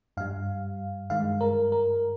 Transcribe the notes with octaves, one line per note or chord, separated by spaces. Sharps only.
G2 G3 F5
G2 D#3 G#3 F5
A#4
A#4